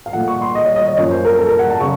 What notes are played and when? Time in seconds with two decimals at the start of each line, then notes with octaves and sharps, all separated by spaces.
0.06 F5
0.13 A#2 F3 A3 F#5
0.28 C#6
0.42 C6
0.55 D#5
0.66 C#5
0.76 D#5
0.82 C#5
0.86 D#5
0.97 F#2 F3 A#3 F4 C#5
1.11 C5
1.25 A#4
1.38 A4
1.48 A#4
1.59 F#5
1.70 A5
1.80 C#3 F#3 C#6